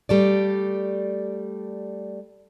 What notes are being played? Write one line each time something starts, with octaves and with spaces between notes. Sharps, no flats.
G3 A3 D5